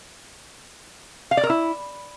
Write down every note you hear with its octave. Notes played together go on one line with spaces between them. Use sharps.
F5
D5
A#4
E4